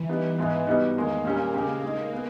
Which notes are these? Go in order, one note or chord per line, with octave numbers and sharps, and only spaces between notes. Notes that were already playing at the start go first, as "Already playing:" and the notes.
Already playing: E3
G3 B3 D#4
G#2 E3 G#3 B3
B2 G3 B3 D#4
E2 D#3 G#3 A#3
A#2 G3 C#4
C#3 G#3 C#4 G4
G#3 A#3 D#4 G#4
G#3 B3